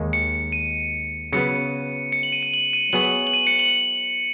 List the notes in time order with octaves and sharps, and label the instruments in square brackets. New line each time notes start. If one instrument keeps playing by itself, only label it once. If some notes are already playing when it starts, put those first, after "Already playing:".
Already playing: [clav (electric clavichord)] D#2 D#3 G#3 D#4
[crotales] C#7
D#7
[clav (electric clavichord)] C#3 F#3 B3 [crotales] C#7
[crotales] C#7
F#7
D#7
D#7
F#7
D#7
[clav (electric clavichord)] F#3 B3 G#4 C#5 [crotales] F#7
[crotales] F#7
D#7
C#7
F#7